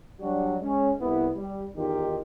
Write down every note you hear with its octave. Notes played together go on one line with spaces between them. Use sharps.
F#3 G3 D4 F#4
G#3 C#4
C2 B3 E4
G3
E2 D#3 D#4 F4 G4